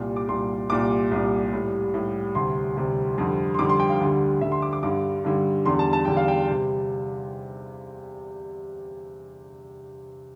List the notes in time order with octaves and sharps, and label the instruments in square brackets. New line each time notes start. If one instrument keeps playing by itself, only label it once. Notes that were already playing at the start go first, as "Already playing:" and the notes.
Already playing: [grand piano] C2 A#2 G3
D6
C2 A#2 G3 C6
C2 A#2 G3 D6
C2 A#2 G3
A2 G3
A2 G3
D2 C3 G3 C6
D2 C3 G3
F2 D3 G3
C6
F2 D3 G3 D6
C6
G5
F5
D2 D3 G3
D2 D3 G3 E5
C6
D6
D6
G2 D3 G3 D6
G2 D3 G3
E2 D3 G3 C6
A5
A5
E2 D3 G3 G5
F5
G5
G5
C3 G3